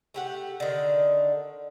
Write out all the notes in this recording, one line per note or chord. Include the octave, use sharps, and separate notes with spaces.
A3 G4 F#5
D3 D#3